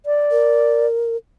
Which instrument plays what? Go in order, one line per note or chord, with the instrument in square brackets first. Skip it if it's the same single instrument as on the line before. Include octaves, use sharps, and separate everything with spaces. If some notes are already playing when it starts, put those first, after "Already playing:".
[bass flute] D5
[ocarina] A#4